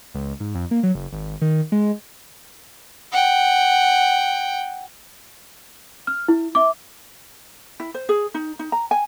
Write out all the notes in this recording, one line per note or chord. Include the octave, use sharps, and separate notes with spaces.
C#2
G#2
F2
A#3
F#3
F#1
G#1
D#3
G#3
F#5 G5
F6
E4
E5 D6
E4
C5
G#4
D#4
D#4
A#5
G#5